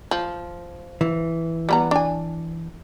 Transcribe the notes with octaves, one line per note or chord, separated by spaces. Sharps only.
F3
E3
G3 B3 A#5
D4 G#5